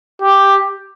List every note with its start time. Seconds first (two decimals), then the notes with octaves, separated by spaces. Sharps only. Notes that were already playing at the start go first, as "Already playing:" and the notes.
0.21 G4